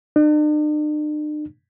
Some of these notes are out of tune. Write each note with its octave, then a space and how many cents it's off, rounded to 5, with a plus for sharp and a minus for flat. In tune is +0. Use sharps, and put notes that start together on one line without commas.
D4 +45